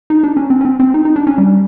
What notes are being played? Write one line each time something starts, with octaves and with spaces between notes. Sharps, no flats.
D#4
D4
C#4
C4
C#4
C4
C4
D#4
D#4
D4
C#4
G3